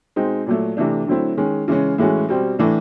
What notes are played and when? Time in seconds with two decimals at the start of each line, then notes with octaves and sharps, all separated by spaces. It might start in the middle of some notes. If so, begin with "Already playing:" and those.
0.16 B2 G#3 C4 D#4
0.47 A#2 F#3 A3
0.77 C3 E3 A3 D4
1.07 D3 F#3 A3 C4 E4
1.37 D#3 G#3 C#4
1.68 C#3 E3 G#3 C#4
1.98 A2 E3 G#3 C#4 F#4
2.29 B2 G3 C4
2.59 A2 E3 A3 D4